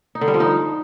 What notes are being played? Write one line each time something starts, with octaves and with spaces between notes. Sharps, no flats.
D#4
D3
G3
F3
D#4